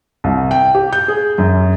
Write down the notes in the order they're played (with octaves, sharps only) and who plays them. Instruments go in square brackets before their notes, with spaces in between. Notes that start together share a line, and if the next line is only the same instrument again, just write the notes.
[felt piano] C2
G5
G4
G6
G#4
F#2